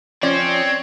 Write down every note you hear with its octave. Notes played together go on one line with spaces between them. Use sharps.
F3 C4 C#4 C#5 D5